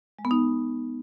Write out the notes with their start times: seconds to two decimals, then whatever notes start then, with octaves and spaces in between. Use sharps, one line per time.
0.19 G#3
0.25 B3
0.31 D#4